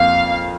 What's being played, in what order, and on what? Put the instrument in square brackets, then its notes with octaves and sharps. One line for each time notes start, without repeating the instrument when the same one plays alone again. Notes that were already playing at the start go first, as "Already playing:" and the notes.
Already playing: [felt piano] F2 F3 A#3 F4 [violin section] F5